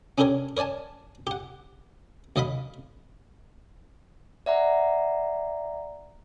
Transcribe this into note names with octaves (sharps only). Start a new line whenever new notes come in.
C#4 D4 G4 A4 A#4 C#5
A#4 C#5 D5 G#5 A5
G4 F#5
D2 F#3 D#5 F5 B5
D5 E5 F#5 A#5